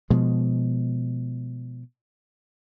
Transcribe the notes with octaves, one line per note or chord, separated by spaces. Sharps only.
B2 F3 G#3